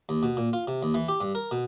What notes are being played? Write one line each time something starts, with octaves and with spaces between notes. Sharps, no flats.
D#2
B2
A#2
F4
C3
D#2
E3
G4
G2
A#4
B2